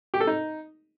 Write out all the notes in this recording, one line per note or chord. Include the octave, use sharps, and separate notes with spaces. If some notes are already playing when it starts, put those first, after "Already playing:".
G4
A4
D#4